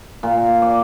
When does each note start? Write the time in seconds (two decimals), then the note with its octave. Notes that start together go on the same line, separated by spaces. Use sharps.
0.23 A#2
0.62 D5